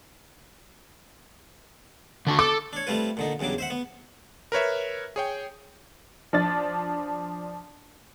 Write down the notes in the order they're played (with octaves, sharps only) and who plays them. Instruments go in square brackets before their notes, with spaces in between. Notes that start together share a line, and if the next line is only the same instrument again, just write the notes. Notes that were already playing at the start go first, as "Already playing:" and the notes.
[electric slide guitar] D3 D4 F#4
[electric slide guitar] A4 [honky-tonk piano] D6
[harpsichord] D4 C#5
G3 A3 C4 F4 B4
A#2 D3 D#4
E2 G2 C#3 F#3 D6
C5 E5 F#5
B3
[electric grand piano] A#4 B4 C#5 E5
G#4 C#5 G5
[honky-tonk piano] F3 D4 A6